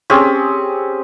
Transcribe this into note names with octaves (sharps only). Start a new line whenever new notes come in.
C4 C#4 G4 G#4